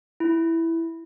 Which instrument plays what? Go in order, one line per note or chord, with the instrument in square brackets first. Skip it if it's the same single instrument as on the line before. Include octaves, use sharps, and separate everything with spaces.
[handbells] E4